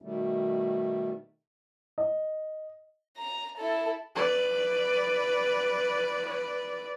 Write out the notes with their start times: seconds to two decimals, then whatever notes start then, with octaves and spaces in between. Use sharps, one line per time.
0.02 B2 D#3 G3 A3
1.98 D#5
3.17 A#5
3.57 E4 A4
4.15 B4 D5